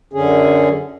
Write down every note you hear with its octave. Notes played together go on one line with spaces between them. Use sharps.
F#2 D3 C#4 G#4